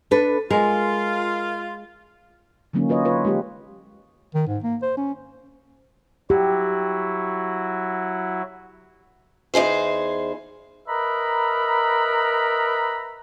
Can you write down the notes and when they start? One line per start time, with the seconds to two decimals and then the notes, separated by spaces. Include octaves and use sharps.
0.11 D4 A4 B4
0.51 G#3 F4 A#4
2.73 D3 E3 F#3 A#3 C#4 D#4
2.89 F4 B4 C#5 D#5
3.05 F4 B4 C#5
3.25 G#3 F4 G4 G#4
4.34 D#3
4.47 G#2
4.64 A#3
4.82 C5
4.97 C#4
6.30 F#3 E4 F#4 G4
9.54 E2 D#4 G#4 C5
10.88 A#4 B4 D#5 E5 A#5 B5